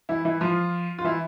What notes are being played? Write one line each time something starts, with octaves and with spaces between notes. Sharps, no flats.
E3 E4
E3 E4
F3 F4
F4
E3 E4